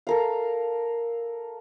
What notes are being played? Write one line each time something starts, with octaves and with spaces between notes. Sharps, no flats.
A4 A#4 F5